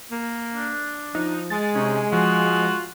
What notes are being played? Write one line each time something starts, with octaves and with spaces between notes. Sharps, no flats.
A#3
D4
F3 D#4
G#3 A6
C3 C#4 D#4
F3 F4 F#4